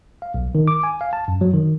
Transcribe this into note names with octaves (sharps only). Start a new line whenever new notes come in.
F5
B1
D#3
D6
G#5
F5
A5
F#2
F#3
D#3